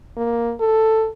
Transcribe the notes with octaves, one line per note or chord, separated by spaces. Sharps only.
A#3
A4